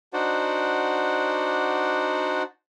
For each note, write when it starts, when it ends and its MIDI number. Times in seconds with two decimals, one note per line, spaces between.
0.13 2.43 62
0.13 2.43 63
0.13 2.43 66
0.13 2.43 72
0.13 2.43 74
0.13 2.43 78